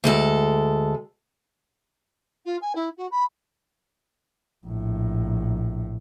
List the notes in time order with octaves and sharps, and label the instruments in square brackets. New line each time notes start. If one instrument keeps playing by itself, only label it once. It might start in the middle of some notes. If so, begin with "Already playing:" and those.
[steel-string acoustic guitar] D2 G#3 A4
[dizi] F4
G#5
E4
F#4
B5
[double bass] A#1 A2